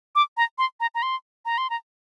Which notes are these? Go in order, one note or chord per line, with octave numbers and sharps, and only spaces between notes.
D6
A#5
C6
A#5
A#5
C6
A#5
C6
A#5